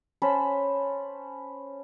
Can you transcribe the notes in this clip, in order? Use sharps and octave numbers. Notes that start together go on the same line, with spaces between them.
C#4 C5 A5 B5